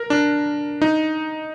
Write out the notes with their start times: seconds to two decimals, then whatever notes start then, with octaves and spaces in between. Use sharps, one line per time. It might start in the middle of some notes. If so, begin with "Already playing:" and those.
Already playing: A#4
0.10 D4
0.82 D#4